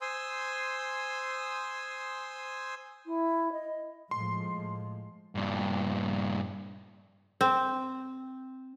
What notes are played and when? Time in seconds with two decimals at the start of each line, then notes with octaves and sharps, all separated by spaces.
0.01 C5 G#5 C6 D#6 E6
3.06 E4
3.52 D#5
4.11 A2 F3 G#3 C6
5.35 G2 A#2
7.41 C4